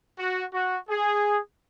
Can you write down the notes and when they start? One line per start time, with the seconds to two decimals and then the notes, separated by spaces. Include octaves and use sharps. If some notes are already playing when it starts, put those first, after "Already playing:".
0.19 F#4
0.53 F#4
0.89 G#4